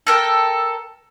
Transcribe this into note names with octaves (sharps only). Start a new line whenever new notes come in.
A4 A#4 G5